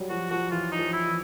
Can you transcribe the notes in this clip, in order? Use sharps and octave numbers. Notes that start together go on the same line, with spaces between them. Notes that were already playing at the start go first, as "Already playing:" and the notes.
Already playing: F#3 G3
F3 F#4
F3 F#4
E3 F4
D#4
F3
E4
E3